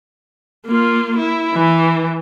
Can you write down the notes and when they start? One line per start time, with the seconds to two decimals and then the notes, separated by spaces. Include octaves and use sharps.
0.66 A#3 F4
1.18 E4
1.54 E3